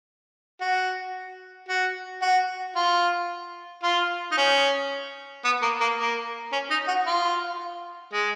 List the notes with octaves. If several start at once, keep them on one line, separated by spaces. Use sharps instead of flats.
F#4
F#4
F#4
F4
F4
D#4
C#4
B3
A#3
A#3
A#3
C#4
D#4
F#4
F4
G#3